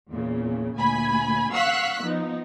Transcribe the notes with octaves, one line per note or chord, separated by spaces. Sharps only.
E2 A#2 C#3
D2 A#2 G#5 B5
F5 F#5 C#6 E6 F#6 B6
F3 B3 D#4